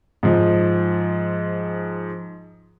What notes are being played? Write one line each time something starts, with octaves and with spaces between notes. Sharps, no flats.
G#2 F3